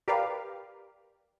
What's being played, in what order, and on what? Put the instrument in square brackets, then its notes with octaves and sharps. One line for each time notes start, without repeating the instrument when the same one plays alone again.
[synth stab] G4 A#4 B4 D5 F5